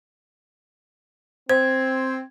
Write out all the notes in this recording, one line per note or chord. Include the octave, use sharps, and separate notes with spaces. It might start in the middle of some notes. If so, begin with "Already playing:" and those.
C4 C5 G#6